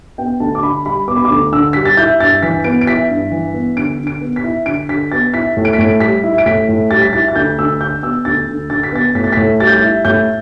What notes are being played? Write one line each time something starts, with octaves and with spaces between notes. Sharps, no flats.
B3 G5
D2 A5
D6
D3 B5
G3 B5
B3 D6
B5
D6
D2
D3 E6
G3 B6
A6
E4 G6
G2 A6
E3 B6
B3 D7
D7
E4 B6
G2
E3
B3
D3 D7
D3
D7
B3
B6
E4
D3 D7
D3 B6
B3 A6
E4 B6
A2
D7
B6
A2 D7
G3 B6
E4
D7
A2 B6
A2
G3 A6
B6
E4 A6
A6
D2 G6
D2 E6
D3 G6
B3 E6
D2 A6
D2
D3 A6
B6
B3 A6
A2 B6
A6
A2 B6
G3 A6
G6
A6
E4
A2 G6